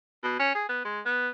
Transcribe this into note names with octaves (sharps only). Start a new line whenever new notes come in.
B2
C#4
G#4
B3
G#3
B3